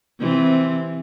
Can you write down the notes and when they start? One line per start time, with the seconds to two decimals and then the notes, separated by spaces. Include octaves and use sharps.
0.20 C3 E3 C4